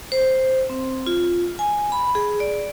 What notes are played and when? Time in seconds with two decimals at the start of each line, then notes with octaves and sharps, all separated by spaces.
0.12 C5
0.70 C4
1.07 F4
1.59 G#5
1.92 B5
2.15 G#4
2.40 D5